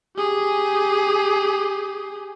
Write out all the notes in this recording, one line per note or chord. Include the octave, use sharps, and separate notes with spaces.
G4 G#4